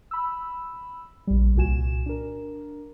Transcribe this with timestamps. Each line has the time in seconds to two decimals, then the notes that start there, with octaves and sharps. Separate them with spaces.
0.11 B5 E6
1.27 A#1 G3
1.56 C2 A#2 F#4 G#5 E7
2.06 D4 A#4